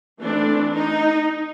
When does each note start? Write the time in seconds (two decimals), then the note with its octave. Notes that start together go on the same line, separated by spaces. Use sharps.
0.21 E3 A3 C4 D4
0.76 D#4